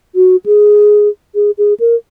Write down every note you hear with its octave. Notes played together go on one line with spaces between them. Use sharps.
F#4
G#4
G#4
G#4
A#4